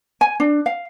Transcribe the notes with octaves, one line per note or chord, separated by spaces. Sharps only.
G#5
D4
F5